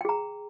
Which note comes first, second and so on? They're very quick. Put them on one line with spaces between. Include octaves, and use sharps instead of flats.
G5 G#4 A#5